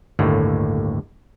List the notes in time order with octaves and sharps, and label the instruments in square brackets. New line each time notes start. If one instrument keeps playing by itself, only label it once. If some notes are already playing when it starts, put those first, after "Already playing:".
[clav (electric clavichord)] G1 D#2 A2 D3 A#3